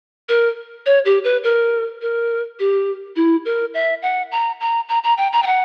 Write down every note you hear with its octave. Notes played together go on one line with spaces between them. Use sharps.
A#4
C#5
G4
B4
A#4
A#4
G4
E4
A#4
E5
F#5
A#5
A#5
A#5
A#5
G5
A#5
G5
F#5